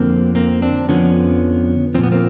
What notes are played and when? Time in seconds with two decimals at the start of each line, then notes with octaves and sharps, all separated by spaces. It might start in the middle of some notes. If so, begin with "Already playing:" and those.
Already playing: F2 D3 F3 A#3 C4
0.35 A#3 C4
0.62 C4 D4
0.88 F2 D3 F3 B3 C#4
1.94 F3 C4
1.98 A#2
2.03 B3
2.12 A#3 C4